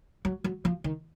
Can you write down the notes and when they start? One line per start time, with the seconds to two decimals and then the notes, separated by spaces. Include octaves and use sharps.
0.25 F#3
0.44 F#3
0.65 F3
0.84 D#3